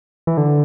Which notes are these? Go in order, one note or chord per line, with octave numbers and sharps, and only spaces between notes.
E3
D3